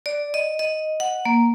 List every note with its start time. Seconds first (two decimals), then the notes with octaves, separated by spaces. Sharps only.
0.06 D5
0.34 D#5
0.59 D#5
1.00 F#5
1.25 A#3